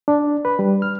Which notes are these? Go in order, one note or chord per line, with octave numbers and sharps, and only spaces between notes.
D4
B4
G3
F6